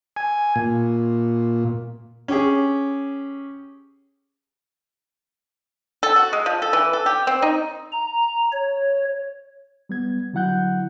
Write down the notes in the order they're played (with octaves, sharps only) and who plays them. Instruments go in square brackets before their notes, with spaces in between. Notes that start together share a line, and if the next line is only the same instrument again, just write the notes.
[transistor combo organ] G#5
A#2
[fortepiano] C#4 G4 G#4
[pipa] A4
F#4
G#3
F3
A4
E3
A4
G4
C4
D#4
[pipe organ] A#5
C#5
[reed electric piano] G3 B3 G#6
D3 F#3 E4 F#5 F#6 G6